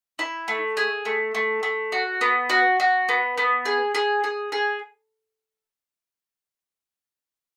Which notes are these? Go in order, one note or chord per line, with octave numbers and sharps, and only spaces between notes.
E4
A3
G#4
A3
A3
A3
F#4
B3
F#4
F#4
B3
B3
G#4
G#4
G#4
G#4